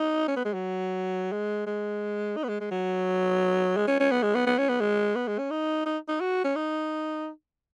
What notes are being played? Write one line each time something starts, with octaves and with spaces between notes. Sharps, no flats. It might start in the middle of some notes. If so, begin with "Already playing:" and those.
Already playing: D#4
C#4
B3
G#3
F#3
G#3
G#3
D#4
B3
G#3
G#3
F#3
G#3
C#4
C#4
B3
G#3
B3
B3
C#4
B3
G#3
B3
G#3
C#4
D#4
D#4
D#4
F#4
C#4
D#4